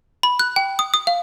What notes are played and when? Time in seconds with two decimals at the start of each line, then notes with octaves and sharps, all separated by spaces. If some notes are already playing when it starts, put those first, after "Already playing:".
0.23 B5
0.39 F#6
0.56 G5
0.79 D#6
0.94 D#6
1.07 F5